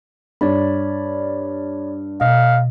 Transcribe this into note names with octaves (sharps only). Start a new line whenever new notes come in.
G2 C#5 D5 B5
B2 D#5 F5